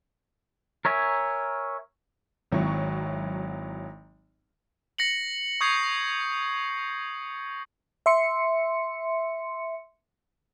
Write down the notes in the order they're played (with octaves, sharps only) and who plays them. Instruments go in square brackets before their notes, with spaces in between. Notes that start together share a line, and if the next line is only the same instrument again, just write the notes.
[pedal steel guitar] A#4 C#5 E5 G#5
[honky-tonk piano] G#1 F#3 E4 C#6
[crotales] A#6 C#7 F#7
C#6 D#6 G6 G#6 C7
[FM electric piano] E5 C6 C#7